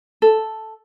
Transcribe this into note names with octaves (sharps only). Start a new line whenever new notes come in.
A4